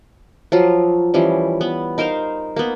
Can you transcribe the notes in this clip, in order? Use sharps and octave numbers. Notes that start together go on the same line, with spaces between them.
F3 F#3 F4
E3 F3 G3 C#4
B3
D#4 A#4 C5 F5
A#3 B3